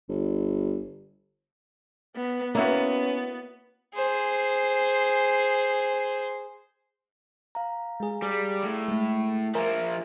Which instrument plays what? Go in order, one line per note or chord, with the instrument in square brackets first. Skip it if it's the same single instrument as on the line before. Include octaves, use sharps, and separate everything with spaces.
[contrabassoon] G1
[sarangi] B3
[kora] A#3 E4 F#4 [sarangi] B3 [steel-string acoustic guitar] C#4
[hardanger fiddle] G#4 C5
[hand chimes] F5 A#5
[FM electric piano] G#3 G#4
[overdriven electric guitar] G3 [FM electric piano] G#4
[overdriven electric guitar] A2
[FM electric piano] G#3 A3
[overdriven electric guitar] F3 A#3 [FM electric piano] A#4 [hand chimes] E5 G#5